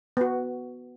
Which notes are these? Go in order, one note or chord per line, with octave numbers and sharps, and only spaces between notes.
B3 F#4